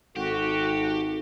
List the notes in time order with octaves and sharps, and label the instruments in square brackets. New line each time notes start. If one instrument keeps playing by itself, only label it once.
[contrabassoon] G#1 [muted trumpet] F#4 [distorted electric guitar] G4 [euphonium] A4